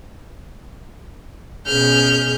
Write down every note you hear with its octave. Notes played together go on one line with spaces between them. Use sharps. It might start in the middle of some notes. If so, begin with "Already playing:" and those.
B2 C#4 G#4 F6 G6